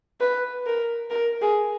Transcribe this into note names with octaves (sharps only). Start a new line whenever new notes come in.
B4
A#4
A#4
G#4